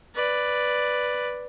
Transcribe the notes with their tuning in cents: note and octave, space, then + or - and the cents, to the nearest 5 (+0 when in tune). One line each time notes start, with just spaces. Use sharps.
B4 +0 D5 +0